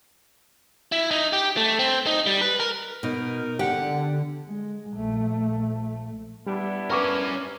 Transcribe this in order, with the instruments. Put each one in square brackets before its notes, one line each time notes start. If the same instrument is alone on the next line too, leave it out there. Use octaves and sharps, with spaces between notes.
[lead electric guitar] E4
D#4
G4
A3
C4
D#4
G3
B4
A#4
[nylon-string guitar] B2 [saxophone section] D#4 A#4
[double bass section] D3 [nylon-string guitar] G4 [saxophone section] F#5
[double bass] G#3
A#1 A3
[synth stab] G3 [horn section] B3 D4 E4
[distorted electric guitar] C#4 A#4 [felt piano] B4 C#6 D6